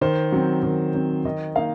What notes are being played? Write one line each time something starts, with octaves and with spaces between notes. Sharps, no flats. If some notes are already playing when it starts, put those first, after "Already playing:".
D#3 C5
F#3 C4
D#3
F#3 C4
D#3 D#5
A#3 D#4 F5